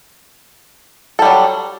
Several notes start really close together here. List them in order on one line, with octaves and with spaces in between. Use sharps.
A4 G3 F#3